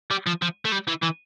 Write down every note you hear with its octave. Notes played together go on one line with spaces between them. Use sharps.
G3
F3
F3
A3
G3
E3
E3